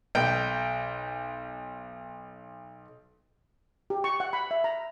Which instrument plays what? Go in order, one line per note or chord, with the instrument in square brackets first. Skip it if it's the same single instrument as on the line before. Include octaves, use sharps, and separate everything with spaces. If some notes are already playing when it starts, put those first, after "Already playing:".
[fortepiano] B1 G5
[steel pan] G4
C#6
F#5
B5
E5
A#5